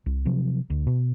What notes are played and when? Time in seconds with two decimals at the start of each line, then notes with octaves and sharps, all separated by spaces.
0.06 C2
0.25 C3 F3 F#3
0.70 D2
0.87 B2